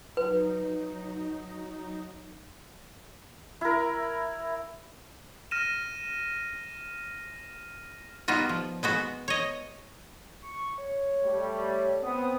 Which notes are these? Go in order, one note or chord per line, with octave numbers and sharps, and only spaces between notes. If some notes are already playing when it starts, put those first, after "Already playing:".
F#3 D#4 B4
E4 A#4
F6 A#6 D#7 E7
G3 B3 D#4 F4 F#4
F3
G#3 B3 F#4
C#5 D#5
C#6
C#5
G3 A3
B3 C4 D#6